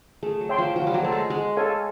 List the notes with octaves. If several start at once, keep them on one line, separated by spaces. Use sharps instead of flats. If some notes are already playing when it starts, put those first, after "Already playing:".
A3 G#4
F#3
C#5 E5 G5 C6
F3
F3 F#4
G3
F#3
A3 A4 C5
G#3
G#3 F#4
A4 C#5 F5 G#5